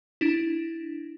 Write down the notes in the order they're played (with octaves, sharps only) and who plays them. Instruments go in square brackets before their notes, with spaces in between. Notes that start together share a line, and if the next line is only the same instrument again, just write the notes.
[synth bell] D4 E4